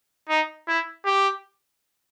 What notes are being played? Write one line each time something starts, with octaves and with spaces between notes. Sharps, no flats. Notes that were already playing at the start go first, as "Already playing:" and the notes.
D#4
E4
G4